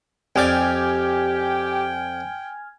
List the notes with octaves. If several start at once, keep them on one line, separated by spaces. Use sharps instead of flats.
F2 G4 D5 G5 G#5 F6 G#6